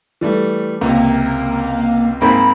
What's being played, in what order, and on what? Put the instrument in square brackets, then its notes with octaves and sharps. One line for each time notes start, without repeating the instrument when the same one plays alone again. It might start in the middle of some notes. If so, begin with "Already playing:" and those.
[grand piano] E3 G3 A3
[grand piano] C#2 C3 [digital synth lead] A#3
[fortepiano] G#2 A#3 C4 [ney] B5